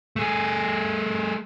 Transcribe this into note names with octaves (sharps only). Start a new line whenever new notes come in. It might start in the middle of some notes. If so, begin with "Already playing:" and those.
A3 G#4